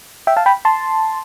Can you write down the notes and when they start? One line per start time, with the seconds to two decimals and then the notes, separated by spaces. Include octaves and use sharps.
0.27 E5 G5
0.37 F5 A5
0.46 G5 B5
0.65 A5 C6